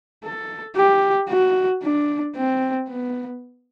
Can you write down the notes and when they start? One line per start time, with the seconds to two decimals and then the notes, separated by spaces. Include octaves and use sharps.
0.24 A4
0.76 G4
1.30 F#4
1.83 D4
2.36 C4
2.89 B3